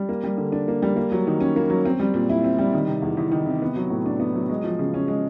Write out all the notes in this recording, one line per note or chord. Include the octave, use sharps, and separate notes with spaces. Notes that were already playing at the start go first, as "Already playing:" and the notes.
Already playing: G3
A#3
G3
D3
D4
A#3
G3
A#3
F#3
D#3
C#4
A#3
F#3
C4
G3
A#2
E4
C4
G3
D#3
C3
E2
E2
D#3
C3
B3
F#3
A2
D4
B3
F#3
G#3
F3
C#3
C#4
G#3